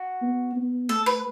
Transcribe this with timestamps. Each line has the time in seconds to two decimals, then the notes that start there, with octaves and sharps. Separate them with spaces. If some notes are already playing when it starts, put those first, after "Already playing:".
Already playing: F#4
0.22 B3
0.56 B3
0.89 A3 A4
1.06 B4